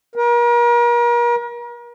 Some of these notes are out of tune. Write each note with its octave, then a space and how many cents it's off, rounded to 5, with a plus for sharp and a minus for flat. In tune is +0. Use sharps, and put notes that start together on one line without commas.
A#4 +40